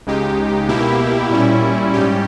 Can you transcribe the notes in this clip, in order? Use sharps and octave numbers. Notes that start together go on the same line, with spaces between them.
C#2 C#3 G#3 D#4 G4
B2 A#3 E4 G4
A#2 G3 C#4 E4
G#2 G3 C#4 G4